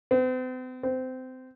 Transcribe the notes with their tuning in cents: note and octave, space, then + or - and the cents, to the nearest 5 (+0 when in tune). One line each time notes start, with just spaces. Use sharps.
C4 -45
C4 -25